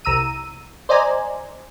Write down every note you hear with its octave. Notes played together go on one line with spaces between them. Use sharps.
C2 A#5 E6 D#7
C5 D5 D#5 G#5 A#5